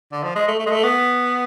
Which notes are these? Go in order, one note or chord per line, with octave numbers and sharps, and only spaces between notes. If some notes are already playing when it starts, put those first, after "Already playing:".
D3
F3
G#3
A3
A3
G#3
A3
B3